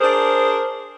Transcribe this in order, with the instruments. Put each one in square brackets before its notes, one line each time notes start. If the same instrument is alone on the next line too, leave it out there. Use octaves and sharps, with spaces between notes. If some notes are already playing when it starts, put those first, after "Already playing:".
[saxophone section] D4 G#4 A#4 C5